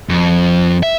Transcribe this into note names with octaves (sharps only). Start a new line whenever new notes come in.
F2
E5